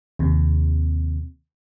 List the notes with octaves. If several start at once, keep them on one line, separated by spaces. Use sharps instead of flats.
D#2 C3